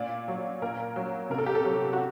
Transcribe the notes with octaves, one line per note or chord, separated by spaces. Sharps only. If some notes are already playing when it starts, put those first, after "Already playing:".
Already playing: A#2 D5
F#3
A#2 A#4
F#3
C3 A#4
A4
G4
A4
F#3
F#4